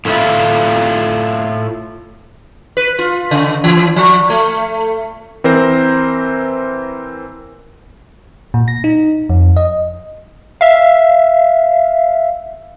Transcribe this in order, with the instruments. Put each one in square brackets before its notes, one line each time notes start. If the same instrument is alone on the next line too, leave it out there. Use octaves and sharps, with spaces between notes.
[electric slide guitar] A2 A3 C#4 E4 F4
[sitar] B4
F4
C#3
E3
F3
A3
[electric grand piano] E3 C4 A#4 C5
[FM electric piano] A#2
A#6
D#4
F2
D#5
[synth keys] E5 F5